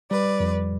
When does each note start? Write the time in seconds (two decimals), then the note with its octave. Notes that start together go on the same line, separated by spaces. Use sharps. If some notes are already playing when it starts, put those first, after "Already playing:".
0.11 G3 B4 D5
0.40 F2